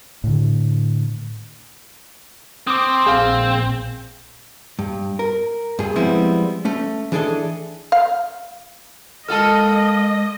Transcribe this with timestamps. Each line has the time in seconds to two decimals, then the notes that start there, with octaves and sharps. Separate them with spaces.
0.24 A2 D3
2.67 C4 D6 D#6
3.07 A#1 C4 G#4 F5
4.79 G2
5.19 A#4
5.79 G2 G#4
5.96 F3 G3 G#3 B3 C4 E4
6.65 A3 C#4
7.12 E3 D4 G#4 A4 D#5
7.92 F5
9.28 G#3 A#3 F4 A4 D#5 A5 F6